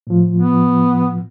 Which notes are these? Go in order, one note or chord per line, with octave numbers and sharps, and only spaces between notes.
A2 F3
B3